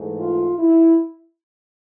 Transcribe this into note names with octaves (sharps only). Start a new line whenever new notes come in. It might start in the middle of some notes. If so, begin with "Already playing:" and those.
Already playing: G#2 E3 A3
F4
E4